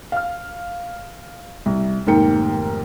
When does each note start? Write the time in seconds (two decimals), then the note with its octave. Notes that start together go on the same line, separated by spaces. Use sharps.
0.12 F5 F6
1.66 C2
2.06 F1 G#2 D#3 A#3 G5 C#7